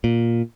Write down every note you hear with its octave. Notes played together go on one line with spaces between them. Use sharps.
A#2